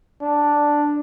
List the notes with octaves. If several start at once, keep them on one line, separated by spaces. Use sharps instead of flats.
D4